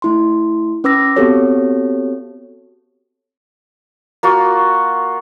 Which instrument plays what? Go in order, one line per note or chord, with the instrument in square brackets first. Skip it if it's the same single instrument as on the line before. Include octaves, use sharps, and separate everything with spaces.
[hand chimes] A3 E4 C6
C#4 B4 D6 E6 A#6
B3 C4 F#4 G4 A4 C#5
[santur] A#3 F4 F#4